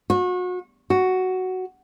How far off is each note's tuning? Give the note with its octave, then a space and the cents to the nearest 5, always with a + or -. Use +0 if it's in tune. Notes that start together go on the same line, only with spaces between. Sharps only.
F#4 -35
F#4 +5